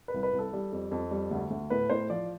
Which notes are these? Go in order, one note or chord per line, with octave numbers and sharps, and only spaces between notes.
B4
C2
B4
C2
A4
G3
F2
F2
G3
D2
D2
A2 B4
A2 C5
F3 D5